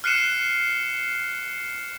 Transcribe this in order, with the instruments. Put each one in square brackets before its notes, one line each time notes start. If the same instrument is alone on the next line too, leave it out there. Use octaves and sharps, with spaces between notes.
[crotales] F6 F#6 C7 C#7 D#7 E7